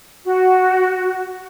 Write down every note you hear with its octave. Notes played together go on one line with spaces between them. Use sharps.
F#4